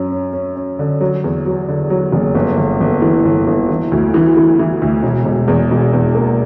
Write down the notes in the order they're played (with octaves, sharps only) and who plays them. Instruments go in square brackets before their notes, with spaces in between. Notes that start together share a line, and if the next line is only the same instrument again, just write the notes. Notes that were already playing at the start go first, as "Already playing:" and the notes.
Already playing: [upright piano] F#2 C#4
C#4
C#4
C#4
D3
F#3
E2
F#3
D3
F#3
F#1
G1
G1
G1
E3
G1
G1
E3
D2
E3
E3
E3
D2
E1
E1
E2
E1
E2
A#3